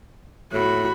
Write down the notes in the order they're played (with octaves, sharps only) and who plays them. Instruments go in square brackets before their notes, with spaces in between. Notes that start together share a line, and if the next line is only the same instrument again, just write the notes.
[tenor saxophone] A2 [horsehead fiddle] F#4 B5